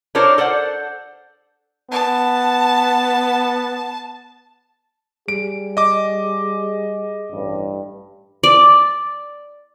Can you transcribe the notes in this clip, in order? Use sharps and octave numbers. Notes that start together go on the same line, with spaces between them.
D4 F4 A4 A#4 C5 C#5
A4 C5 D5 F#5
B3 A5
G3 G#4 D7
D#5 D6
A1 G2
D5